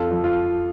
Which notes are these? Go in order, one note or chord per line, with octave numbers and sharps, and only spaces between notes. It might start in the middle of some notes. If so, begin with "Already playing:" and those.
Already playing: F2 F4 A4
F3
F4